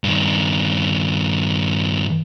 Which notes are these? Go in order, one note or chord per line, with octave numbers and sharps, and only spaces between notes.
G2 D#3